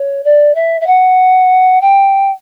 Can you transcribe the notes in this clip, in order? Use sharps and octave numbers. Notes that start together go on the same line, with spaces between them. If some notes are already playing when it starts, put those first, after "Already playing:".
Already playing: C#5
D5
E5
E5
F#5
G5